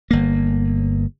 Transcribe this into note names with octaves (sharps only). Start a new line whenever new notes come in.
G1 A#3